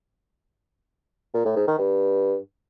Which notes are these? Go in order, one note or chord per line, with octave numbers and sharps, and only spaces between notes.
A#2
A2
G#2
D#3
G2